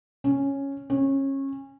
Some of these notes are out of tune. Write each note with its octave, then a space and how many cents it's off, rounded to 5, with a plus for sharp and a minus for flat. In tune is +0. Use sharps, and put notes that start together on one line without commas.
C#4 -5
C#4 -25